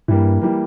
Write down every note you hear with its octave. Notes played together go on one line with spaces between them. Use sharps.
G2 E3 G3 A#3
E3 G3 A#3